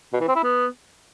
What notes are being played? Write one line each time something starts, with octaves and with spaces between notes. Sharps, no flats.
B2
E3
C4
E4
B3